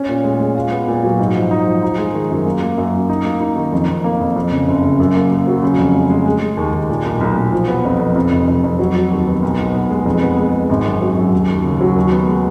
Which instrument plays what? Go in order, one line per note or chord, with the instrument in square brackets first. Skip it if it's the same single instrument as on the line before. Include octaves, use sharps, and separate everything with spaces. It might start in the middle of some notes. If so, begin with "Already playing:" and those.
Already playing: [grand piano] C#4
A#2
G#3
G#3
F4
B3
A#2
F#3
G#2
F3
D#4
F3
D#4
G#3
D#3
F#2
A#3
A#3
F#2
F#2
D#4
A#3
D#4
D#3
F2
F2
A#3
F2
F2
C#3
F#1
C#3
F#2
A#3
A#3
F#3
C#3
F2
G#3
G#3
G#3
G#3
D#2
D#2
A#2
B1
B1
B1
F3
B3
F2
F2
F2
F1
F2
F2
F#3
F#3
D#2
B3
B1
B1
B3
G#3
F2
B3
G#3
G#3
G#1
F#2
F#3
F#2
D#2
D#2
C#3
F#3
D#2
B3
G#3